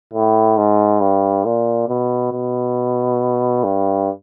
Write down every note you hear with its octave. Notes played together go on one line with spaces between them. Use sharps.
A2
G#2
G2
A#2
B2
B2
G2